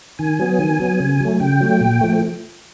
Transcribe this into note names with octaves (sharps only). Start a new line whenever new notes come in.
D#3 G#5
F#3 B3
D#3
F#3 B3
C#3
F#3 A3
C#3 G5
F#3 A3
A#2
F3 A3